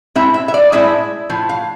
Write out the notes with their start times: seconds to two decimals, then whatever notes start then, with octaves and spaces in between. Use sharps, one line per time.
0.15 A2 G#3 C4 E4 E5
0.34 E5
0.48 E5
0.54 D5
0.72 A2 G#3 C4 E4 E5
1.30 A2 F3
1.49 F5